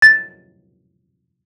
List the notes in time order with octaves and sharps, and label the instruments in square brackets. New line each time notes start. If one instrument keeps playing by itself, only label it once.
[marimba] A6